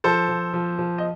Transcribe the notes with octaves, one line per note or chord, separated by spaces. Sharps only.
F3 A4 C5
F3
F3
F3
D#5